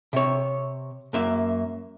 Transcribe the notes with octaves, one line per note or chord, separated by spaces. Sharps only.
C3 C#5
F#2 A#3 E5